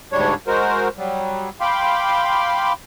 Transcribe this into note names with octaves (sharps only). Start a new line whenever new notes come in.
D2 G#2 G3 D4 C#5
G#3 F#4 A#4 C5
F#3 G3
F5 G5 B5 C6 D6